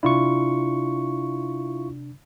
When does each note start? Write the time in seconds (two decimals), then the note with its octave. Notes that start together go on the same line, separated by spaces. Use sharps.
0.03 C3 D4 E4 F4 C#6